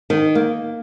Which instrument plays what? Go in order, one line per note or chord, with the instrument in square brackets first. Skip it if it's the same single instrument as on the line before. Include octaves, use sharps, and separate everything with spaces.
[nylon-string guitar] D#3
A#3